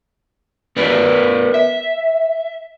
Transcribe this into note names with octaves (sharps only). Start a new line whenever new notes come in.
B3 A#4 B4 D5
E5